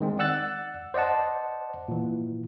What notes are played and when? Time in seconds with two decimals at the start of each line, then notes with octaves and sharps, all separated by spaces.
0.01 D#3 G#3 C4
0.19 D5 F#5 E6 F#6 A6
0.94 C5 D5 D#5 F#5 A5
1.88 A#2 E3